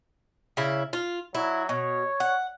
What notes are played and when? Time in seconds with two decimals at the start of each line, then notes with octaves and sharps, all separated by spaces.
0.57 C#3 E4
0.93 F4
1.35 F#3 E4
1.69 B2 C#5
2.20 F#5